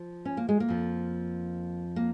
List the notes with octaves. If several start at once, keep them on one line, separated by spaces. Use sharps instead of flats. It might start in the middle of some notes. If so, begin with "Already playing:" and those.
Already playing: F3
C#4
A#3
G#3
A#3
F2 F3
A#3